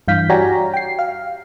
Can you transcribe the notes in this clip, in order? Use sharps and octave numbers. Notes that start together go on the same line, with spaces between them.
G2 E3 F5 G6 B6
F#4 G4 C#5 D5 G#5 A#5
G5 C7
F5